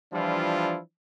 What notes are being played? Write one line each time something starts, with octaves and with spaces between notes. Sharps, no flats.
E3 F3 G3 D4 E4 F4